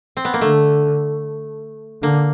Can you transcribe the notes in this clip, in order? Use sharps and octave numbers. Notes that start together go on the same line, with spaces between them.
C4
B3
A#3
D3 A3
D3 A#3